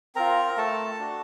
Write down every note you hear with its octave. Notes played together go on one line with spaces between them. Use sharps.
C4 F4 A#4 A#5
A3 A4 A5
D4 F#4